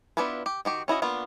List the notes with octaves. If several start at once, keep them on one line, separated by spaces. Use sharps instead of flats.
B3 D4 E4 F4 B4
G4
D#3 F#4 G4
C#4 E4 F#4 D#5
A#3 B3 D4 F4